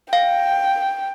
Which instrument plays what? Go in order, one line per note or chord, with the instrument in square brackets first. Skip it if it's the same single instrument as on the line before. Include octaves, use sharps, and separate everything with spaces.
[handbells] F5 [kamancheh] G5